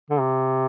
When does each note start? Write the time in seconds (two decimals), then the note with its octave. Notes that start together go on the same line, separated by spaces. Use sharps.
0.11 D3
0.20 C3